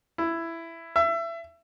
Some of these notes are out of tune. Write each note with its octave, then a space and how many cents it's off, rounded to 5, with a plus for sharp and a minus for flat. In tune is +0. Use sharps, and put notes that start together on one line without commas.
E4 +10
E5 +25